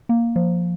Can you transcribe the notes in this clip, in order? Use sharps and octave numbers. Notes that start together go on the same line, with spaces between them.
A#3
F3